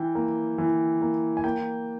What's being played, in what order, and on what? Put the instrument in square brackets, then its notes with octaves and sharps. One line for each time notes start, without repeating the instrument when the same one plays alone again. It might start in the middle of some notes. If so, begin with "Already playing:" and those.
Already playing: [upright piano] E3 G5
A#3
E3
A#3
G#5
A#3 G5